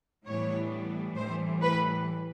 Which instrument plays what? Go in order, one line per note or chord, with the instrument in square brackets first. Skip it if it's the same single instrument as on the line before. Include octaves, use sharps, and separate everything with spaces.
[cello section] A2 E3 G3 B3 D4 C#5
A2 E3 G3 C5
B4